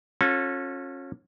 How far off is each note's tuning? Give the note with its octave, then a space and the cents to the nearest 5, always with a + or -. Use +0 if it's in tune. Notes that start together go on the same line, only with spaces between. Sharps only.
C#4 -25 F4 +40 A4 +0